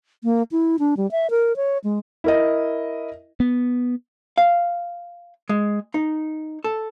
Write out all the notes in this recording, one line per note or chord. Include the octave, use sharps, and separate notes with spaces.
A#3
E4
D4
G3
E5
A#4
C#5
G#3
E4 A#4 D#5
B3
F5
G#3
D#4
A4